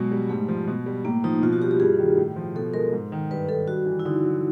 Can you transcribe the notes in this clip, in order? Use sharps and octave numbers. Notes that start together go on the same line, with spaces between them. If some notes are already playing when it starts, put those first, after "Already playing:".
Already playing: B2 F#3 G#3
G3
G#2 A3
F3
B2
G3
A2 A#3
F3 D#4
B2 F4
F#4
G3 G4
G4
G2 G#4
D#3
A2
F3
B2 A4
G#3 A#4
G#2
D#3
G2 B4
D#3 A4
G2 F#4
E3
E4
D3 D#4
F#3